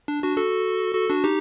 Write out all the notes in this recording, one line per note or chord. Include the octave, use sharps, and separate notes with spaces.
D4
D4 F#4
F#4 A4
F#4 A4
D4 F#4
D#4 G4